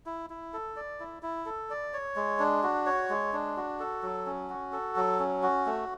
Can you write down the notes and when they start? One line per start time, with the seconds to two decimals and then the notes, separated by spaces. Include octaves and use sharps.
0.06 E4
0.30 E4
0.53 A4
0.76 D5
1.00 E4
1.23 E4
1.46 A4
1.70 D5
1.94 C#5
2.16 G#3
2.40 D4
2.63 F#4
2.86 C#5
3.09 G#3
3.33 D4
3.57 F#4
3.80 A4
4.03 F#3
4.26 C#4
4.49 F#4
4.72 A4
4.96 F#3
5.19 C#4
5.43 F#4
5.66 A3